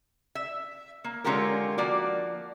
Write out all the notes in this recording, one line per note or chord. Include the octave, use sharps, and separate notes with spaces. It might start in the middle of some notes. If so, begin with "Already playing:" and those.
E5
A#3
D3 G#3 C#4 F4 G4 A#4
F3 A#3 F#4 D5